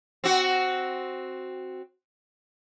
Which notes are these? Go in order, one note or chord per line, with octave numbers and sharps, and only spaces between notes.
C4 F#4